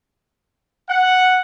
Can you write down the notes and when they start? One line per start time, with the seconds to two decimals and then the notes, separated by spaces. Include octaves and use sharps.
0.90 F#5